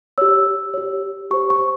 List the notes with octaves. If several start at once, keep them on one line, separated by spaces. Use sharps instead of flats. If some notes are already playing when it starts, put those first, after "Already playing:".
G4 C#5 E6
G4 C#5
G4 C5 C#6
C#6